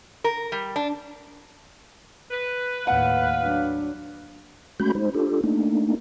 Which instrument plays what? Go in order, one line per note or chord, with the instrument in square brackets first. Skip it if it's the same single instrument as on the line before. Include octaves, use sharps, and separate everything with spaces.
[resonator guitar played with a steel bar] A#4
G3
D4
[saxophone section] B4
[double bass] D#2 A2 [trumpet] F5 [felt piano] F#5
[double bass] F#3 D4
[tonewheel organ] G#3 A3 C#4 F#4 B5 G6
G#3 D#4 C5
D4 F4 G4 A4
A3 A#3 D4 D#4